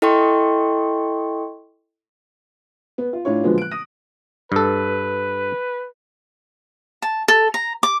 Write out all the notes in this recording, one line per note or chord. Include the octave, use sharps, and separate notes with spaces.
E4 A4 D#5 G5 C6 C#6
B3
F4
A2 D4 F4 C#5
A#2 D3 F3 F#3 G#3 B3
F#6 D7
D#6 A#6 D#7
G2 A4 B4
A5
A4
A#5
D6